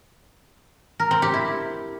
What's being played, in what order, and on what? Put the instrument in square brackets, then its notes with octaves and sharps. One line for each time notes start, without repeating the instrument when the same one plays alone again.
[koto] A#4
C4
G4
E4